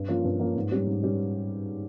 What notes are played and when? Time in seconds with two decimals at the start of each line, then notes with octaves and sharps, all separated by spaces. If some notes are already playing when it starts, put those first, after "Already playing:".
Already playing: G2
0.08 F3 A#3 C#4 F4
0.25 G2
0.40 F3 A#3 C#4 F4
0.56 G#2
0.71 G3 C#4 G4
0.87 G#2
1.03 G3 C#4 G4